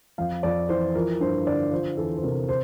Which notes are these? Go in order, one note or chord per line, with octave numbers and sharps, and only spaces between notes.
F2 F5
F2 D5
E3 C5
F3 A#4
G2 C5
D3 D5
F3 C5
E2 A4
C5
C3 A#4
C5